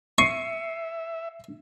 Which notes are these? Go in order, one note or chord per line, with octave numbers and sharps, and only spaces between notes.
E5 C#6 C7 C#7 D#7